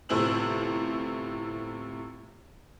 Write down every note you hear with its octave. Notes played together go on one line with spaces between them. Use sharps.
G1 A2 C3 C5 E6 F#7